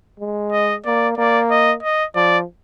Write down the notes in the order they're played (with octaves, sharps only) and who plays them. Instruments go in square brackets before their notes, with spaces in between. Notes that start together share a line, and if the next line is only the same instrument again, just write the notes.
[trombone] G#3
[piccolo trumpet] D#5
[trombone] A#3 [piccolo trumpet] D5
[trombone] A#3 [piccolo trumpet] D5
[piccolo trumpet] D#5
D#5
[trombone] F3 [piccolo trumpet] D5